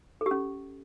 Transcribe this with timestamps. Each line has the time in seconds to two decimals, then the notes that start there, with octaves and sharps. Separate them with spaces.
0.21 A4
0.26 G4
0.31 C#4